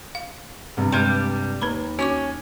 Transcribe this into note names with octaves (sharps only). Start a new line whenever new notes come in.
F5
G2 C3
G3 G#3 B4 C6
D#2 B4 A#5 B5
C#4 F#4 C#6 D6